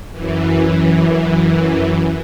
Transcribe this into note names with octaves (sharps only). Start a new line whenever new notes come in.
F#2 E3